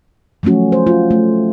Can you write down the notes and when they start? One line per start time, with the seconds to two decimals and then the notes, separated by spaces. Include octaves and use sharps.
0.43 F3 F#3 A3 C#4 F#4
0.72 C5
0.87 F4
1.11 A3